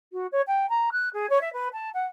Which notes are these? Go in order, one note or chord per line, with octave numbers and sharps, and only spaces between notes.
F#4
C#5
G5
A#5
F#6
G#4
C#5
E5
B4
A5
F#5